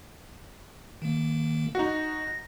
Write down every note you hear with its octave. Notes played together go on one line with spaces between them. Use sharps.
D#3 A#3
D#4 F#4 A#6